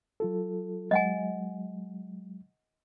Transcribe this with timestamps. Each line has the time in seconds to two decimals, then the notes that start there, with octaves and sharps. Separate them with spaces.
0.20 F#3 F4 A4
0.91 F#3 G#3 D#5 F#5 G#5